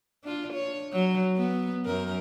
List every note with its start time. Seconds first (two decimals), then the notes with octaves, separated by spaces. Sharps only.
0.24 D4 F4
0.53 C#5
0.93 F#3
1.37 B3
1.85 F#2 A#4